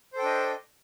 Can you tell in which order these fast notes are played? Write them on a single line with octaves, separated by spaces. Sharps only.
C5 A4 G5 D4 D#5